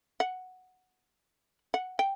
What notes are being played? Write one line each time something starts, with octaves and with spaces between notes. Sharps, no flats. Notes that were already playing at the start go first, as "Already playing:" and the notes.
F#5
F#5
G5